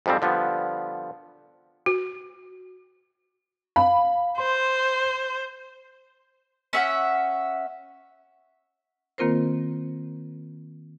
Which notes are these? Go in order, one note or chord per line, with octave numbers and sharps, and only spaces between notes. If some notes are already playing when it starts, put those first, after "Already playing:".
F2 G#2 F3 G3 C4
D3 F3 G3 B3
F#4
F5 B5
C5 C6
C#4 E5 F#5
D#3 A#3 C4 F4 A#4 C5